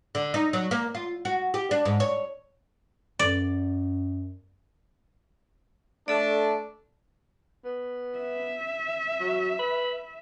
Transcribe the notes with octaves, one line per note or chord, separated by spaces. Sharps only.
D3
D#4
F#3
A#3
F4
F#4
G4
D4
G#2
C#5
F#2 D5
A3 D4 A4 D5
B3
E5
F#3
B4